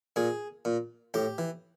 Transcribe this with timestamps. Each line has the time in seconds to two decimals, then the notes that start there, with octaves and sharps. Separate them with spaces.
0.16 A#2 G#4
0.65 A#2
1.14 A2 G4
1.38 E3